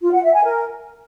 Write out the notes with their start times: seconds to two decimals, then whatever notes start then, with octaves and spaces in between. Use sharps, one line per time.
0.02 F4
0.13 F#5
0.23 E5
0.34 G#5
0.44 A#4